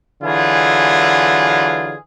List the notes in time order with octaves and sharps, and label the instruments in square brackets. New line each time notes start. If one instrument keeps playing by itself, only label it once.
[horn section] D3 E3 F#3 F4 G#4